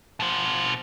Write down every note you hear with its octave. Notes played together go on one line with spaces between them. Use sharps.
B2 C5